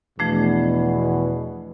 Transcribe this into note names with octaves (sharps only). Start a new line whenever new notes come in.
E2 B2 F3 A3 D4